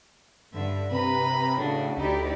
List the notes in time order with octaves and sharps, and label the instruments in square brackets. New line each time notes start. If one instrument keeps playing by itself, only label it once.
[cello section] G2 D3 [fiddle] E5
[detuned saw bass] C3 [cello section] B4 [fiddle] A#5 B5
[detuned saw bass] A2 [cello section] C#3 [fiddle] D4 F#4
[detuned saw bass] D2 [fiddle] D#4 [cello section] E4 G4 D5